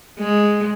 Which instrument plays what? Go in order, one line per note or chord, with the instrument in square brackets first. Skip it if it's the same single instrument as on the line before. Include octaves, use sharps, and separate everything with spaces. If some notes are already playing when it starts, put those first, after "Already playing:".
[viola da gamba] G#3